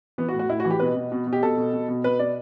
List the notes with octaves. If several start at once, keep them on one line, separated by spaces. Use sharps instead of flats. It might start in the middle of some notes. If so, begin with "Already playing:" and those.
E3 B3
F#4
A2
F#4
A2 E4
F#4
E3
G4
B2 B4
B2
B2
B2
G4
B2 A4
B2
B2
B2
B2 B4
B2 D5